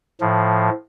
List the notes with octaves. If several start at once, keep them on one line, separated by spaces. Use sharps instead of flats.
A2 F3